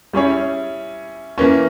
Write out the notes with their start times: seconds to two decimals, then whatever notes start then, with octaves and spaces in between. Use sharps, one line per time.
0.13 G3 C#4 E4 G#4 C#5
1.38 E3 A#3 C#4